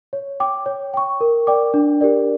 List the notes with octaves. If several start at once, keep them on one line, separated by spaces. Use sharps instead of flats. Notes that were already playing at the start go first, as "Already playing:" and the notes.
C#5
G5 D6
C#5
G5 C#6
A#4
D5 G5 D6
D4
G4 A#4 D5